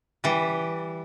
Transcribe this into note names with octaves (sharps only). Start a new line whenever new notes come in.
E3 G3